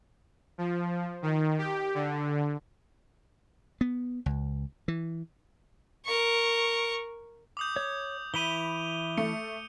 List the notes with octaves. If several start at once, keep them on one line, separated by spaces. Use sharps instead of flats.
F3
D#3
G4
D3
B3
C#2
E3
A#4 C#6
D6 D#6 G6
C#5
E3 E4 B5 D#7 F7 G7
A3 C#7